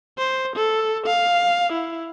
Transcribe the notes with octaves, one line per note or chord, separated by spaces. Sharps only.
C5
A4
F5
E4